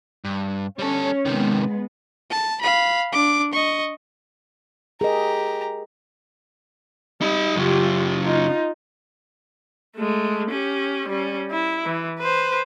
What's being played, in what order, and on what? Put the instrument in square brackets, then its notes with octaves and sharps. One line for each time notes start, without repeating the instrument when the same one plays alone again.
[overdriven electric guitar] G2
[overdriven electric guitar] G3 A4 [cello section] C#4
[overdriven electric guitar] C3 D#3 [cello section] G#3 B3
[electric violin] A5
F5 B5
D4 D6
D#5 C#6
[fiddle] G4 A#5 [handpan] G#4 A#4 D#5
[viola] G3 [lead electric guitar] D#4 B5
[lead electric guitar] F#2 C#3 [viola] F4 G4
[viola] D#4 F4
G#3 A3
C#4 G4
G3 C#4
E4
E3
B4 C5